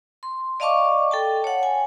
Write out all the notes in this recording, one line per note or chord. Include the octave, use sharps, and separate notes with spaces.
C6
D5 D#5 F5 A5 C#6 D6
A4 G5 A5
C#5 F#5
G#5